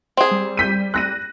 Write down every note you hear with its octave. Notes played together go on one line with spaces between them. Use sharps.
C4 G#4
G3
G6 B6 D#7
F#6 A#6 D#7